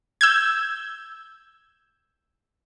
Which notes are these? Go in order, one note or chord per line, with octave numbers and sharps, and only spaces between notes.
E6 G6 G#6